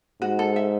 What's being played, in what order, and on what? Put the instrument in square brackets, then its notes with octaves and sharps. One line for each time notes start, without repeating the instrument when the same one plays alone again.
[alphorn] G#2 [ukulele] F#4
[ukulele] A4
E5